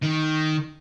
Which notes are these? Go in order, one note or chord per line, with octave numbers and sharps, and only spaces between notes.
D#3